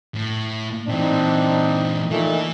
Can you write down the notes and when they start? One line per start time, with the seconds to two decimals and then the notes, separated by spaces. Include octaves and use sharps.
0.15 A2
0.88 A#2 E3 C4 D4 D#4
2.11 A#2 E3 A3 D#4